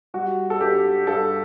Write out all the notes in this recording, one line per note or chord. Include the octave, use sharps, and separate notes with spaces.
G3 F#4
A4
G2 G4
G2 A4